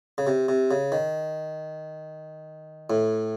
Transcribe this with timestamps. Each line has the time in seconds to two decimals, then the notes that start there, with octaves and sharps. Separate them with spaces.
0.18 C#3
0.27 C3
0.49 C3
0.71 C#3
0.92 D#3
2.90 A2